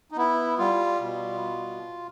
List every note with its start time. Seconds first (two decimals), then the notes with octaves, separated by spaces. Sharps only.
0.11 D#4
0.16 B3 E4
0.58 G3 F4
1.01 B2